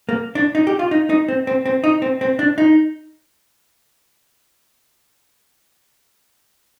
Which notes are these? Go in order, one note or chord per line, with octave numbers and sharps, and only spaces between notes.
A#3
D4
D#4
G4
F4
D#4
D#4
C4
C4
C4
D#4
C4
C4
D4
D#4